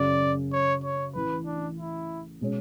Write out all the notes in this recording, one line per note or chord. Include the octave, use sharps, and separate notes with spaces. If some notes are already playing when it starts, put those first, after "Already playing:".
Already playing: F#2 C#3 F#3 D5
C#5
C#5
A1 A2 E3 B4
D4
E4
B2 G#3 C#4